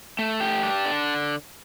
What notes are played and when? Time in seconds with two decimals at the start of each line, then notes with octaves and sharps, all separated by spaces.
0.19 A3
0.40 G4
0.63 D4
0.85 D3